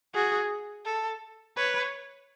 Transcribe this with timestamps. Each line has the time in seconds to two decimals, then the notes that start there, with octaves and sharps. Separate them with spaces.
0.14 F#4 G#4
0.85 A4
1.57 B4 C#5